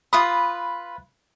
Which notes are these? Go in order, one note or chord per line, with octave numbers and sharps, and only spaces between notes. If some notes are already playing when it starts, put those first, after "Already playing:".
F4 B4 B5 D#6